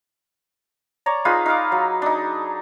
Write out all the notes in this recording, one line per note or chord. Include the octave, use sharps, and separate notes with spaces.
C#5 D5 A#5
D#4 F4 G#4 B4
D#4 F5 D6
F#3
D4 D#4